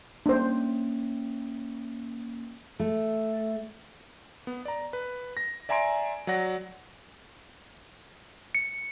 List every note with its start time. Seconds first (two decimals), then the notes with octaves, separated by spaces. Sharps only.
0.26 A#3 C#4 D4 C5
2.80 A3
4.47 B3
4.65 D5 A#5
4.93 B4
5.37 A#6
5.69 D5 E5 G#5 A#5 C6 D7
6.27 F#3 D5 F#5 A#6
8.55 C#7